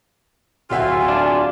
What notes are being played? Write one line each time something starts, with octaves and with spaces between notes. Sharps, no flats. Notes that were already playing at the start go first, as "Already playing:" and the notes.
D1 F4 F#4 E5 G#5
D4